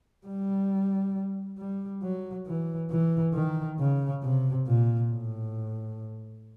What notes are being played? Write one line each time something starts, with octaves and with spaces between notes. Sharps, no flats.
G3
G3
F#3
E3
E3
D#3
C#3
C3
A#2
A2